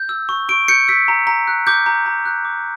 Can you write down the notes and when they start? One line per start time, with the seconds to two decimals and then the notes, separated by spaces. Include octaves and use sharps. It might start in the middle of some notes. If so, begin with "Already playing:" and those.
Already playing: G6
0.09 E6
0.29 C#6
0.49 C#6 D7
0.68 G6 C#7
0.88 E6 B6
1.08 A#5
1.27 A#5
1.48 F#6
1.67 D6 G6
1.86 A#5
2.06 A#5
2.25 F#6
2.45 D6